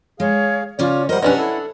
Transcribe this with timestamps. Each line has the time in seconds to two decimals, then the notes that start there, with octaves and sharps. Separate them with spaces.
0.20 G#3 G#4 C#5 F5
0.79 C#3 C#4 F4 C#5 D5
1.09 G3 A#4 C5 D#5 F#5
1.22 C3 F#3 C#4 D4 B4 C#5 D#5 F#5
1.37 E4 A4